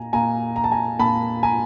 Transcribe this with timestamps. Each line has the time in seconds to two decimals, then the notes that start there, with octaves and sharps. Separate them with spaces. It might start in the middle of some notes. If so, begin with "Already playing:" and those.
Already playing: A#2 G#5 A#5
0.13 A#2 G#5 A#5
0.56 A#5
0.64 A5
0.72 G#5 A#5
0.99 A#2 A5 B5
1.43 G#5 A#5